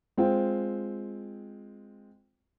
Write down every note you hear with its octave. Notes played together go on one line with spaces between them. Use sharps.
G#3 C4 F4 G5